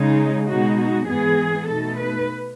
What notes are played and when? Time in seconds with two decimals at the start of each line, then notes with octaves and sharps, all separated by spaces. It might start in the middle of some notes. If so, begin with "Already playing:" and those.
Already playing: C#3 G#3 D#4
0.49 B2 G#3 D#4 F#4
0.79 F#4
1.07 G#2 E3 B3 G#4
1.67 B2 A3 D#4 A4
1.97 B4